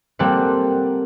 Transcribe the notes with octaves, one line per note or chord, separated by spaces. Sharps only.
G3 A#3 C4 G4 A4 F#5